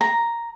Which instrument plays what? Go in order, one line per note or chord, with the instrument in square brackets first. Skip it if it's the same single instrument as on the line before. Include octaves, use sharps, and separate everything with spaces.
[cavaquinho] A#5